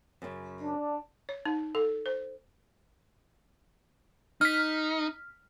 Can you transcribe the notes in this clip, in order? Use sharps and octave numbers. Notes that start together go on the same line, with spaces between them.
F#2 C#3
D4
C#5
D#4
A4
C5
D#4 F6 B6